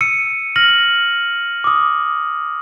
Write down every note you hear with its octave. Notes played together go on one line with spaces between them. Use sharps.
E6 C#7 D#7
F6 A#6 F#7
D6 D#6